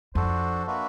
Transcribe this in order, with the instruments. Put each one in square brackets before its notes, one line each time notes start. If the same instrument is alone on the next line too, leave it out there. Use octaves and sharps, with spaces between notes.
[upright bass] F2 [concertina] D4 F#4 A4 C5
[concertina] A#3 D4 F#4 B4 E5